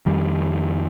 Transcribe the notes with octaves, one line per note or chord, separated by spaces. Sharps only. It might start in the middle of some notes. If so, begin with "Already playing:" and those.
F2 D#3 G3